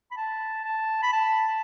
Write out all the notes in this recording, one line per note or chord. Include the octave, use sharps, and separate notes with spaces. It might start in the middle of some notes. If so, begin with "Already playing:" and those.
B5
A5
A5
B5
A5